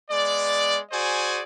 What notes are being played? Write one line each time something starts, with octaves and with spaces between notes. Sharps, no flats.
G#3 B3 D5
F#4 G#4 C5 D5 G#5